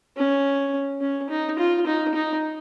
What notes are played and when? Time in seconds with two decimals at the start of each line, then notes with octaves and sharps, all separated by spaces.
0.17 C#4
1.01 C#4
1.29 D#4
1.59 F4
1.87 D#4
2.15 D#4